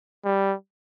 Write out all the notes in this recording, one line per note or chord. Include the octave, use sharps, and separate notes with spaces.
G3